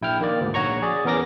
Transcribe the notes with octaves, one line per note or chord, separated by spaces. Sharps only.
A#1 E4 G5 F6
D#3 A#3 D5
D2 G#2
A#1 F#4 C#5 A#5 C#6
G#4 D5
E2 B3 C#4 A#4 D6 A#6